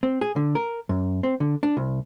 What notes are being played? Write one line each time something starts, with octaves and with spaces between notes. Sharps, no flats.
C4
G#4
D3
A#4
F#2
C4
D3
D4
C2